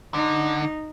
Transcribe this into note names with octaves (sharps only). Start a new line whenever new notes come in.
D3 D#4